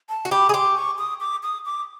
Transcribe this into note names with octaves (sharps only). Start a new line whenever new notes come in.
A5
F#4
G4 B5
G#4
G4 C6
C#6
D#6
D6
D#6
D6